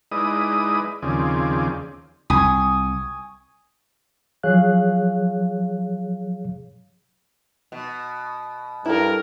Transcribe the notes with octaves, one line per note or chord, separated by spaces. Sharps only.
G#3 D#4 E4 B4 D5 D#6
D#2 C#3 F3 C4 G#4 D5
C2 G#5 C#6 D#6
F3 F#3 G#4 C#5 F5 F#6
B2
G2 E4 A4 A#4